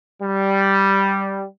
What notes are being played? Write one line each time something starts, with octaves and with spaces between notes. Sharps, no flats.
G3